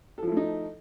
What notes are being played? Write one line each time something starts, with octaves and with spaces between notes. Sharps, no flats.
F3 A3 D#4 E4 A4